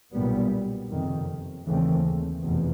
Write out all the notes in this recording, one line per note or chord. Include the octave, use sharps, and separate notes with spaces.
B1 A#2 G3 B3
F#1 F2 C3 D#3
D#2 C#3 E3 A3 C4
F1 E2 B2